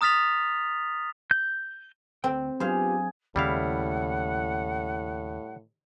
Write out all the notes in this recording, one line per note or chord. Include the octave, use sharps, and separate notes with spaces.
A#5 D#6 F6 A6 B6 F7
G6
D2 C4 G5
F#3 B3 D4 F4 G4 G#4 C5 F5
D#2 A2 C#3 G3 E4 F5 F#5